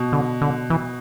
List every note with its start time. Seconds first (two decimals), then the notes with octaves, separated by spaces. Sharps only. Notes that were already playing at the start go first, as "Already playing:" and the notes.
Already playing: B2
0.12 D3
0.42 D3
0.70 E3